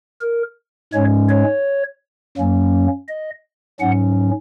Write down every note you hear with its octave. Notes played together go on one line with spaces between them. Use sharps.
A#4
G#2 G#3 C#4 C#5
C#5
F#2 F#3 A#3 C#4
D#5
G#2 F#3 C#4 F#5